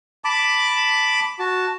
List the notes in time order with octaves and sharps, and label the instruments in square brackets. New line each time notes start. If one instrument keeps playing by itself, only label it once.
[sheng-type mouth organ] A5 [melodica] B5 D6
[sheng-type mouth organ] F#4 A5